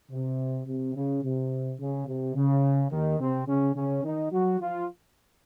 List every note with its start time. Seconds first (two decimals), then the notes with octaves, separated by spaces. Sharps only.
0.12 C3
0.68 C3
0.95 C#3
1.23 C3
1.80 C#3
2.07 C3
2.35 C#3
2.91 D#2 D#3
3.20 C3 C4
3.47 C#3 C#4
3.75 C#3 C#4
4.04 D#3 D#4
4.32 F#3 F#4
4.60 F3 F4